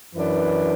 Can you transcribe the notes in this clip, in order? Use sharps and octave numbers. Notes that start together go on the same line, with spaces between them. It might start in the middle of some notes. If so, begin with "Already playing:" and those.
F#2 E3 D4 B4